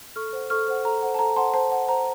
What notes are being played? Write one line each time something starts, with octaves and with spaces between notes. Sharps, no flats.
A4 C#6 F6
C5 F#5
A4 C#6 F6
C5 F#5
A4 A#5
C5 F#5
A5
A4 A#5
C5 F#5 A5 C6
C5 A5
F#5
C5 A#5